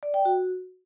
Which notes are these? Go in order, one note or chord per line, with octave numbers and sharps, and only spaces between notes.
D5
G5
F#4